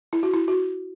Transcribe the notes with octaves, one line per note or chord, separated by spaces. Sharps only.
E4
F#4
E4
F#4